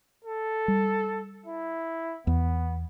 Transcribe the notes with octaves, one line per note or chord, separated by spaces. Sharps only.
A4
G3
E4
E2 B3